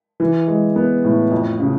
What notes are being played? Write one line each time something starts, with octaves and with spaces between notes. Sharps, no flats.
E3
G#3
B3
A2
F2
C#3